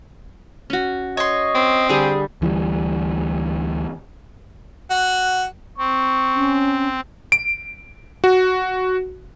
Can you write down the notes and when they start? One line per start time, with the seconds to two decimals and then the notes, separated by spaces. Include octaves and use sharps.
0.70 C#4 F#4
1.17 C#5 D#5 C6
1.55 C4
1.89 D3 G3 G4 G#4 G#5
2.42 D2 E3 F3 G3
4.90 F#4
5.78 C4 C#6
6.36 C#4
7.32 D7
8.24 F#4